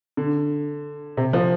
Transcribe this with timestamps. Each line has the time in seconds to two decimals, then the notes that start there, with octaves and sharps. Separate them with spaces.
0.17 D3
1.17 C3
1.33 F3